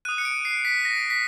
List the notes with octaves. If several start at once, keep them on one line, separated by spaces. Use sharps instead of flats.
D#6 F#6 D#7
C#7
D7
C7
B6
A#6
B6